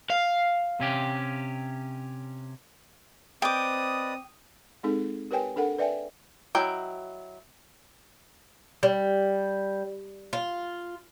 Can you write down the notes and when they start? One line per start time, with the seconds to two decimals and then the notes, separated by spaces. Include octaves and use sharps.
0.10 F5
0.80 C3 C#4 G4
3.42 C4 B4 D5 D#5 G5 D6 D#6
4.83 G#3 C4 D#4 G#4 A4
5.31 G4 A#4 B4 C#5 G5 G#5
5.56 D4 A4 A#4 F#5
5.79 B4 D5 E5 G5 G#5
6.55 F#3 E4 D#5 G5
8.83 G3
10.33 F4